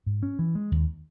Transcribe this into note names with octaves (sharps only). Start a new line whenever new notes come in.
G#2
C#4
E3
G#3
D#2